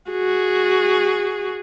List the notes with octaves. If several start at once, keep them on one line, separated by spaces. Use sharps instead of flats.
F#4 G#4